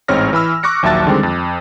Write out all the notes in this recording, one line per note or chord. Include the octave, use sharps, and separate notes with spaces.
A1 G#2 C4 C#5 F6 A#6
E3 B5 E6 F6
C#6 D6 F#6 A#6 C#7
A#1 D#2 F#3 E5 A5 A6
D3 D#3 G3 G#3 C4
F2